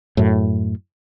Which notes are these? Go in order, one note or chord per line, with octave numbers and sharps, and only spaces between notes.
F#2 A2